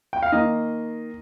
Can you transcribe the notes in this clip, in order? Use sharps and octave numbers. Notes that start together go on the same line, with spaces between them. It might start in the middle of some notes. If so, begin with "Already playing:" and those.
G5
F5
D#3 A#3 D#5